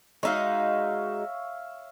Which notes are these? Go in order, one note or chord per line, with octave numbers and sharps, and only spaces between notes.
G#3 D#4 F#4 C#5 E5 F5